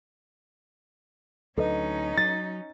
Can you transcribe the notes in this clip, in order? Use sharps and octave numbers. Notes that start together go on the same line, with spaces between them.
D2 F#3 C#4 D#4 A4 B4 D#5
F#3 A6